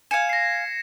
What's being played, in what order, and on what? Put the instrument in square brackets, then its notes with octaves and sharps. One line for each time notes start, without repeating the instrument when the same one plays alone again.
[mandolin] F5 G#5 [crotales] G#6 C#7 E7
[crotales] A#6 C7